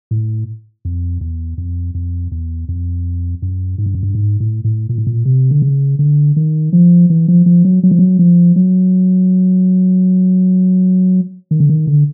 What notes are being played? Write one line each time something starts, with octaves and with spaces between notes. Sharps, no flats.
A2
F2
E2
F2
F2
E2
F2
F#2
G#2
G2
F#2
G2
G#2
A2
A2
A#2
A2
A#2
C3
D3
C#3
D3
D#3
F3
E3
F3
F3
F#3
F#3
F3
F#3
F3
F#3
D#3
D3
D#3
D3